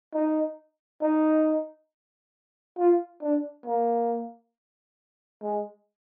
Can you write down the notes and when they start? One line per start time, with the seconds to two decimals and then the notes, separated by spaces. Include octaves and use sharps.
0.14 D#4
1.02 D#4
2.78 F4
3.22 D4
3.66 A#3
5.42 G#3